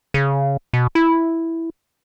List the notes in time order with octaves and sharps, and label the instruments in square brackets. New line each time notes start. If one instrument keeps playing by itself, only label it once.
[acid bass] C#3
B2
E4